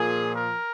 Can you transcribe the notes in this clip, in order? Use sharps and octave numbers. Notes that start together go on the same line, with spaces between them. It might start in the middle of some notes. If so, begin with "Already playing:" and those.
Already playing: A#2 F3 A#3 G#4
A#4